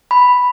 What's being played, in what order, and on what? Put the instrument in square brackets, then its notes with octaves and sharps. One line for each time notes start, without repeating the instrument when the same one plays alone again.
[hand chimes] B5